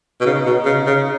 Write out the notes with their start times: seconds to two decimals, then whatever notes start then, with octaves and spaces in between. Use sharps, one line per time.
0.21 B2
0.26 C#3 D#4
0.46 B2
0.65 C#3
0.86 C#3